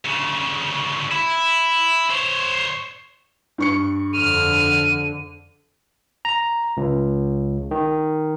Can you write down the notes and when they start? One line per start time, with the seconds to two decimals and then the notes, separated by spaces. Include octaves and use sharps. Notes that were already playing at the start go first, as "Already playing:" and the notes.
0.05 D2 C#3
1.12 E4
2.10 C5 C#5
3.58 G2 C#6 C#7
4.13 F2 D3 F6 D#7
6.25 A#5
6.77 C#2
7.71 D#3